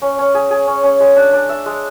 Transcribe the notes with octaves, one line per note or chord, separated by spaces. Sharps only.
C#4
C#4
G#4
G#4
C#4
C#4
G#3
D4
D4
E5
G#3